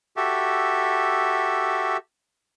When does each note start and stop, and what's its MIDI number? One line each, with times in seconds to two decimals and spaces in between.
0.17 1.97 66
0.17 1.97 67
0.17 1.97 69
0.17 1.97 76